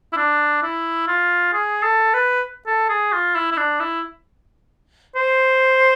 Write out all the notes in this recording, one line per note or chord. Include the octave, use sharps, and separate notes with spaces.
E4
D4
E4
F4
G#4
A4
B4
A4
G#4
F4
E4
E4
D4
E4
C5